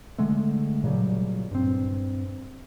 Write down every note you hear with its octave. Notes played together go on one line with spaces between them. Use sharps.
D3 G#3 A3
A#2 C#3 F#3 G3
G2 C4